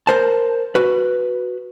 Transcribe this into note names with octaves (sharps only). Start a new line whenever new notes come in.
A#4 C5 A5
F#4 B4